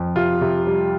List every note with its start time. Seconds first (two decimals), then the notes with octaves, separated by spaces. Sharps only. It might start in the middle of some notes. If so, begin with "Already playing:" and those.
Already playing: F2
0.16 C3 F4
0.41 C3
0.67 G3